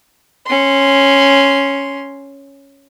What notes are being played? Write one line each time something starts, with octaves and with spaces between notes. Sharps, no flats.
C#4 C6